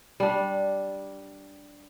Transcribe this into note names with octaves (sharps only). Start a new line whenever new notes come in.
G3 D4